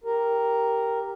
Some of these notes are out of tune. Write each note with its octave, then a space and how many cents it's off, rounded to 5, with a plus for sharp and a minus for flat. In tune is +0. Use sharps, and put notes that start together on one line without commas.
G4 +0 A#4 +0